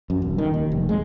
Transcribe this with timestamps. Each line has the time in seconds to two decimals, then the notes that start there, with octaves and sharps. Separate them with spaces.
0.10 F#2
0.22 D#1
0.38 D#3
0.54 D#2
0.72 F1
0.89 G#3